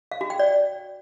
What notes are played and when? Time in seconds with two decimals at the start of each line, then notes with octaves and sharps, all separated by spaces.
0.12 F5
0.21 F#4
0.30 G5
0.39 D5